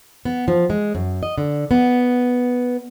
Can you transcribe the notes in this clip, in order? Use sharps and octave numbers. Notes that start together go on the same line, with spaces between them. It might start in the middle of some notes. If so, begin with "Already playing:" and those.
B3
F3
G#3
F#2
D#5
D3
B3